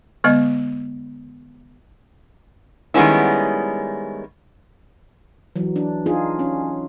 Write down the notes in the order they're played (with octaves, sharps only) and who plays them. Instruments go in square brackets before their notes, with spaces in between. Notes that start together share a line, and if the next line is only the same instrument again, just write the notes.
[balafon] D3 G#3 B3 D#5
[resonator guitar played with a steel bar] D#3 G3 G#3 B3 C#4 E4
[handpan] E3 F#3
D4
D4 D#4 F4 G#4
C#4